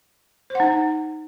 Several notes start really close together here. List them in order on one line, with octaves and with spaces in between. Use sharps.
C5 F#5 D#4